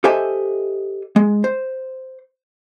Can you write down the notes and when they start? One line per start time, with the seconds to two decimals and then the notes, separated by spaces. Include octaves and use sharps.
0.04 G4 A4 C5 D#5 E5 G#5
1.16 G#3
1.44 C5